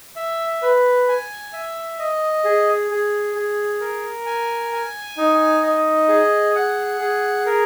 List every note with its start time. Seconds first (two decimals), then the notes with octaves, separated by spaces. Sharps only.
0.16 E5
0.62 B4
1.08 G#5
1.53 E5
1.99 D#5
2.45 G#4
2.91 G#4
3.35 G#4
3.81 A#4
4.26 G#5
4.73 G#5
5.17 D#4
5.63 D#5
6.09 G#4
6.55 F#5
7.00 G#4
7.46 A#4